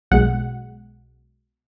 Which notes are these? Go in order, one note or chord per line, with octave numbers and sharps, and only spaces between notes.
B1 B2 G#3 F#5